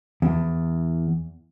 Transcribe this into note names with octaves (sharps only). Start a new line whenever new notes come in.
E2